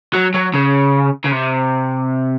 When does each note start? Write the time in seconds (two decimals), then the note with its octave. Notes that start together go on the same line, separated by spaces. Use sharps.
0.14 F#3
0.34 F#3
0.54 C#3
1.25 C#3
1.32 C3